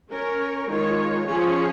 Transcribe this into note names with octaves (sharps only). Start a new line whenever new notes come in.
C#4 A#4 C#5
D#3 G#3 F4 C#5
F3 C#4 F4 G#4 C#5